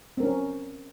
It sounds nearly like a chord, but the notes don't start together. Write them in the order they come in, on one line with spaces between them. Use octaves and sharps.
C4 A#4 C#4